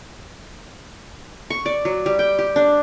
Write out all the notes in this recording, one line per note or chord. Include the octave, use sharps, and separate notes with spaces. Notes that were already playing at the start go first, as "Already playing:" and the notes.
C#6
D5
F#3
G3
G5
G4
D4